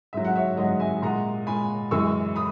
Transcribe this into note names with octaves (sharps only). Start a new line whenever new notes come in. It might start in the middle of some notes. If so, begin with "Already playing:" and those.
G#2 F#3 E5
F#5
C#5 E5
G#2 F#3 D#5 F#5
E5 G#5
A#2 G#3 F#5 A#5
A#2 G#3 G#5 B5
F#2 E3 G#3 C#6 E6
B5 D#6